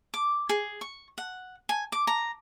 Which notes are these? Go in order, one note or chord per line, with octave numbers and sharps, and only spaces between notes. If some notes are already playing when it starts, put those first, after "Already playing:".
D6
G#4
C#6
F#5
G#5
D6
A#5